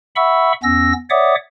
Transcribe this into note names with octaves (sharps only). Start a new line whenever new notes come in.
E5 F#5 B5 C#6 E6
E2 B3 C#4 E6 A#6
C#5 D5 E5 F#5 D6 D#6